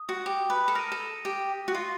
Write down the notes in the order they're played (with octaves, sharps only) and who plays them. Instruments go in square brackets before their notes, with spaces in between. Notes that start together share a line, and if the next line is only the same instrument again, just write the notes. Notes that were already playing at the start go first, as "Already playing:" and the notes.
Already playing: [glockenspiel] D#6
[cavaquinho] F#4
G4
B4
A4
[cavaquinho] A#4 [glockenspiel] F6 A#6 D#7
[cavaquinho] A4
G4
F#4
F4